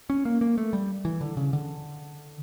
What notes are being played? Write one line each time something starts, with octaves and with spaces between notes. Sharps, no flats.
C#4
A#3
A#3
A3
G3
E3
D3
C#3
D3